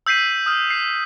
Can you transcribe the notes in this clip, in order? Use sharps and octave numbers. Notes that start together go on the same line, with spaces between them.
E6 G6 B6 C7 D#7
D#6 F6
C7